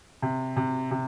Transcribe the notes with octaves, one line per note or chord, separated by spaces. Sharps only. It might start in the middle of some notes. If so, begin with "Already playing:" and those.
C3
C3
C3